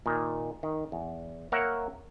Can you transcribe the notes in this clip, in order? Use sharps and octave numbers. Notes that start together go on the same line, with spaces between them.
A#2 D#3
D#3
E2
A#3 A#4 C#5 E5 F#5